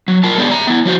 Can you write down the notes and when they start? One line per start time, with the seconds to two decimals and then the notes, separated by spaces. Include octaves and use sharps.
0.08 F#3
0.24 F4 A#4 A5
0.38 G#3 B3 D4 F4 G4 G#4
0.51 E5 A#5
0.67 B3 E4
0.85 F3 F#4 C5